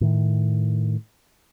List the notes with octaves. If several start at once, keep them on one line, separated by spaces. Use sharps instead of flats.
A2 D#3